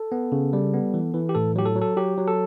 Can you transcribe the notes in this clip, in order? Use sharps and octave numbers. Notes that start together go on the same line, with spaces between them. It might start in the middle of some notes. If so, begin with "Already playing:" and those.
Already playing: A4
B3
C#3
G3
B3
E3
E3
G4
A2 A4
F#3 G4
A4
F#3
A4
F#3 G4
F#3
A4